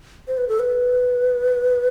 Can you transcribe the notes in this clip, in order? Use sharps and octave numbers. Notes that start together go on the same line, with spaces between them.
C5
B4
A4
B4